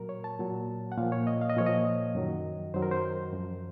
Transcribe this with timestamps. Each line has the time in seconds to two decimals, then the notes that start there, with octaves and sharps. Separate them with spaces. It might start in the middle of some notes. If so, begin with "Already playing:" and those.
Already playing: A#2 F#3 A#4
0.09 C#5
0.24 A5
0.39 A#2 F#3
0.92 F#5
0.97 A#2 F3 F5
1.12 C#5
1.27 D#5
1.41 F5
1.50 D#5
1.57 A#2 F3 C#5
1.67 D#5
2.15 F#2 D#3 F#3
2.74 F#2 D#3 F#3 C5
2.82 A#4
2.91 C5
3.33 F#2 F3